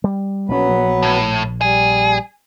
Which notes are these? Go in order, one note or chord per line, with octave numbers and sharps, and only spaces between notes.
G3
A#1 F#3 B3 C#4 B4
A#1
A2
G3 G#4